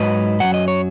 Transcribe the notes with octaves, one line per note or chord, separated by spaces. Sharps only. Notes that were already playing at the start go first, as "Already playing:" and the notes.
Already playing: G#2 F#3 B4 D#5
F#2 F#3 F#5
D#5
C#5